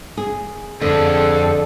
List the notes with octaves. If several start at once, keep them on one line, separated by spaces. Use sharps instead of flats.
G#4
F2 D3 G#4 A4